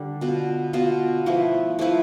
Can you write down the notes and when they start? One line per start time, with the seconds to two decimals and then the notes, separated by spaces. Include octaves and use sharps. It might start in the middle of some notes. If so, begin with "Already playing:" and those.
Already playing: D3 G3 D4
0.21 B2 B3 F4
0.73 B2 B3 F4
1.26 F3 A3 E4 B4
1.79 F3 A3 E4 B4